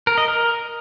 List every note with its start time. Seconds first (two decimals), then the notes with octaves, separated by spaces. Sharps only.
0.07 A#4
0.18 D#5
0.28 A#4